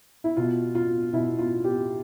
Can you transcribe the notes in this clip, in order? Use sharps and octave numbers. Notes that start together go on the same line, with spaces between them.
E4
B2 F4
F4
B2 E4
F4
G4